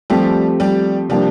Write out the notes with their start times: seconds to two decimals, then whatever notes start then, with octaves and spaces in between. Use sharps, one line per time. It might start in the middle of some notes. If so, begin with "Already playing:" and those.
0.10 F3 G3 A3 C4 G4
0.60 G3
1.09 C3 F3 G3 A#3 D4